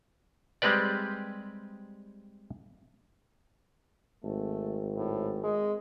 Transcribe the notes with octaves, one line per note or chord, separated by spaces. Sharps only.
G3 G#3 C4 G4 B4 D5
G#1 A3
A2
G#3